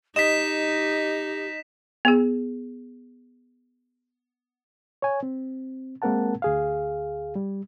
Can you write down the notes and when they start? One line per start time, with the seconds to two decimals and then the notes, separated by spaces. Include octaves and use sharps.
0.16 D#4 G4 D#5 B6 E7
2.05 B3 G#4
5.02 C#5 G#5
5.23 C4
6.02 G#3 A#3 C4 A#4 F#5 A5
6.42 D2 G#4 F5
7.36 G3